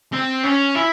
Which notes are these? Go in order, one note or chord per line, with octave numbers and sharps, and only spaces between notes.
C4
C#4
E4